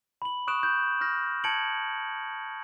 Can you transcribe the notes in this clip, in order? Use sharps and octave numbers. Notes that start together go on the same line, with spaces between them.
B5 F#7
C#6 D#6 F#6 D7 E7
G6
D#6 F6 G6 A#6
A5 G#6 C#7 D7 F#7